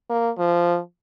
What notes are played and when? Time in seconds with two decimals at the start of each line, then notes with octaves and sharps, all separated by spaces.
0.10 A#3
0.38 F3